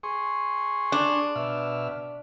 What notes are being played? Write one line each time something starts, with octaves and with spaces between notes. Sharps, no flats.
G#4 C6 C#6
D4
B2 E5 F6